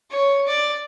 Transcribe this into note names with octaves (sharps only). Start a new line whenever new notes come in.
C#5
D5